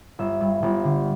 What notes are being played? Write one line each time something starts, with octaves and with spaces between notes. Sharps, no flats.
G1 E5
G2
G1
D3